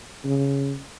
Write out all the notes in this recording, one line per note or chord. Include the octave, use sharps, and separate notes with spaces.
C#3